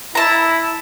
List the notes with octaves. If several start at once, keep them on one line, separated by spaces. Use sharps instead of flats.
E4 A5 A#5